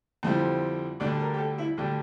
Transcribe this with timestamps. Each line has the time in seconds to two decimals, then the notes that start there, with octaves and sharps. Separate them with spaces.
0.23 F2 D3 G3 C4 E4
1.00 D2 D3 G3 D4 D5
1.20 A#4
1.34 G4
1.38 A4
1.58 E4
1.77 D2 D3 G3 D4 G4